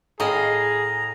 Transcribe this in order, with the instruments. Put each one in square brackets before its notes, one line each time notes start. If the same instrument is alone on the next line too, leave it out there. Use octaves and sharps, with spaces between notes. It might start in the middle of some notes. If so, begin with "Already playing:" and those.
[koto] A2 D#5 F5 [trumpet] G#4 [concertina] A#5